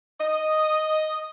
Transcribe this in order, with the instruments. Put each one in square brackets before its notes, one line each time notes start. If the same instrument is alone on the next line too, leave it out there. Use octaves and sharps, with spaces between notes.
[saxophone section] D#5